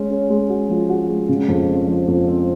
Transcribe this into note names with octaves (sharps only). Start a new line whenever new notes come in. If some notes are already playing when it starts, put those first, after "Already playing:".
Already playing: G#3 C#4
C#4
G#3
F#4
F3
F#4
G#3
C#3
F2
C4
F3
F2
C4